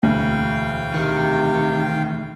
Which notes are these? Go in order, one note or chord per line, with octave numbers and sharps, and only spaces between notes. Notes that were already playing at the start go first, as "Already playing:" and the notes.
E1 D2 F5 G5
C3 D#3